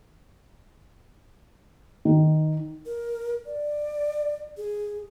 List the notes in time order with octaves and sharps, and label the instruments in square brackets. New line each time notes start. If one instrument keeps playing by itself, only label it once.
[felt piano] D#3
[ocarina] A#4
D5
G#4